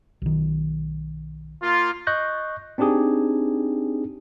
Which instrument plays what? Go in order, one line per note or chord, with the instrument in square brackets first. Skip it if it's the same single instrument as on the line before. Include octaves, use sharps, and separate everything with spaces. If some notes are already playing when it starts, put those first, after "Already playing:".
[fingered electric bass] B1 D#3
[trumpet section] A#3 F4
[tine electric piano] D#5 C#6 F#6 G6 A#6
C4 D4 D#4 G4 G#4